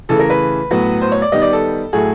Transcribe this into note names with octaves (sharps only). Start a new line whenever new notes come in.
C#3 E3 A3 A4
A#4
B4
A2 F#3 B3
C5
C#5
D5
D#3 G3 B3 D#5
D5
A4
A2 F#3 A3 G#4